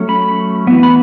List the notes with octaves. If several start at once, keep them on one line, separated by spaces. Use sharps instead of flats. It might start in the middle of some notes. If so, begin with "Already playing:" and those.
Already playing: F#3 A3 C#4
B5
E3 B3
B5